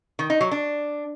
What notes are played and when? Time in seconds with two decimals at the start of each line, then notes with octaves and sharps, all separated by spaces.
0.19 D#3
0.30 D#4
0.41 F#3
0.51 D4